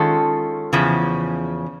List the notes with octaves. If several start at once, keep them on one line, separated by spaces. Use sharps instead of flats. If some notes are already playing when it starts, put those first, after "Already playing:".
Already playing: D#3 G#3 C#4 F4 A4
E2 C#3 F3